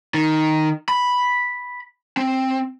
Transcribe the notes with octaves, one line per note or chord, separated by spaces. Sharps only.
D#3
B5
C4